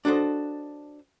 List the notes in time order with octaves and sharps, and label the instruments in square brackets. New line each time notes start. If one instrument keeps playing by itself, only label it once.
[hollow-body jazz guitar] D4 F#4 A4 C5 D#5